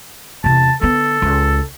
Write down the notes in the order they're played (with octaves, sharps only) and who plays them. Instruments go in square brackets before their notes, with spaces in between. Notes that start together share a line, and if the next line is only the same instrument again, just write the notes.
[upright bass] E2 C3 [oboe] A5
[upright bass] D3 B3 [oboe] A4
[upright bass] C#2